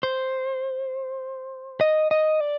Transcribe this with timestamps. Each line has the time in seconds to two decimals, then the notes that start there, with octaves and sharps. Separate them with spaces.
0.03 C5
1.81 D#5
2.11 D#5
2.40 D5